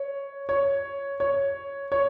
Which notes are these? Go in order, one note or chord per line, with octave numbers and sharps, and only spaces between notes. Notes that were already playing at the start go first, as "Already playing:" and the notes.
Already playing: C#5
C#5
C#5
C#5